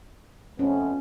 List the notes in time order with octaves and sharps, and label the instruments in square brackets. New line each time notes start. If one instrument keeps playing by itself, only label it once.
[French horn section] F2 A3 B3 [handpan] C#4